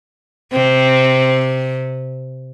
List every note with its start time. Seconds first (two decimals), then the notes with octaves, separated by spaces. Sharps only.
0.52 C3 C4